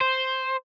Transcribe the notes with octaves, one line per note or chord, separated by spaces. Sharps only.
C5